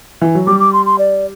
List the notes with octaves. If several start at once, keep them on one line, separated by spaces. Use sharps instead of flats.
E3
F#3
G3 D6
D6
C6
C6
D5